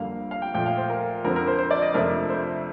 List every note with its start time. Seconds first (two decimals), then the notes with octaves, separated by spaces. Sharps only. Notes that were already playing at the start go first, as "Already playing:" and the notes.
Already playing: F2 D3 G3 A#3 F5
0.31 F5
0.42 G5
0.54 A#2 F3 A3 G5
0.66 F5
0.77 C5
0.90 A#4
1.24 F2 D3 F3 C4 A#4
1.36 A#4
1.48 C5
1.59 C5
1.71 D5
1.82 D#5
1.94 F2 C3 F3 A3 D4 A#4
2.29 C5